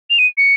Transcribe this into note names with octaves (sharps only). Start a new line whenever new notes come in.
F7
D#7
C#7